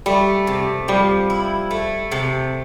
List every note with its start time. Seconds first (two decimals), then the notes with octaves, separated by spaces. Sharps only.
0.06 G3 A3
0.47 C3
0.88 F3 G3
1.30 E4
1.71 A3
2.12 C3